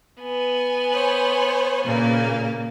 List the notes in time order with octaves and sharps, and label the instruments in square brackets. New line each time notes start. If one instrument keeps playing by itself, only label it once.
[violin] B3 G#5
[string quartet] C5 C#5
A#2 C#3 A#3